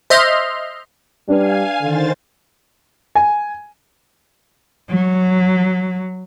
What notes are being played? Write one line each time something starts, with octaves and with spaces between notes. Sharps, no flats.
C5 D#5 E5 C6 F6
G3 D4 B4 F5 G#5
D3 D#3 C5 A6
G#5
F#3